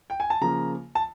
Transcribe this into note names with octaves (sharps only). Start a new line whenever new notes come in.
G5
G#5
A5
C#3 F3 A#3 A#5
A5